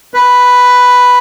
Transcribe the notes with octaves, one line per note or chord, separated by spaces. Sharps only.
B4